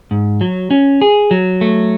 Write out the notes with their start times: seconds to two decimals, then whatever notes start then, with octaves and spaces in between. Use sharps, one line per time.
0.11 G#2
0.41 F#3
0.71 C#4
1.01 G#4
1.31 F#3
1.61 A3